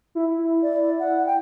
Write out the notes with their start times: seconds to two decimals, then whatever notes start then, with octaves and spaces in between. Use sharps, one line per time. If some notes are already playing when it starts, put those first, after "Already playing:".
0.15 E4
0.62 D5
0.99 F#5
1.26 G5